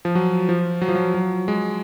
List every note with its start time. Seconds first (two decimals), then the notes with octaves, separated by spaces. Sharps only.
0.05 F3
0.15 F#3
0.49 F3
0.82 F#3
0.89 F3
0.95 F#3
1.14 F#3
1.48 G#3